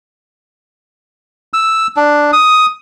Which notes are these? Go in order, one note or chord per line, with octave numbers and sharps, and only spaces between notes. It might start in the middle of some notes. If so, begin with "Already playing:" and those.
E6
D4
D#6